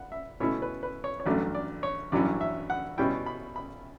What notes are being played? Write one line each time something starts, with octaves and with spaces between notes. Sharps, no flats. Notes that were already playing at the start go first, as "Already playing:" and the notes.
Already playing: F#5
E5
B2 A3 C#4 E4 C#5
B4
B4
C#5
C#5
A1 G2 F#3 A3 D5
D5
C#5
A1 G2 F#3 C#4 E4 D5
E5
F#5
B2 G3 C#4 E4 G5
B5
B5